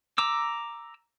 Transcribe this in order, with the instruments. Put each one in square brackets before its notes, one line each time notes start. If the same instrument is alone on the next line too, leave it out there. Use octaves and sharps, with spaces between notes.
[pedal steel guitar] A#5 D6 E6